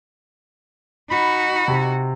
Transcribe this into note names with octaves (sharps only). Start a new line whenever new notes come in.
D#4 F#4 B5
C3